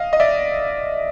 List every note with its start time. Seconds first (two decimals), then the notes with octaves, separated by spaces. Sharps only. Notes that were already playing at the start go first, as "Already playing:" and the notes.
Already playing: D#5 F5
0.13 D#5
0.20 D5 E5